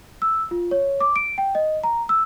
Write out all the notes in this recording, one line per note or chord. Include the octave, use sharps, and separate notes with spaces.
E6
F4
C#5
D6
D7
G5
D#5
A#5
E6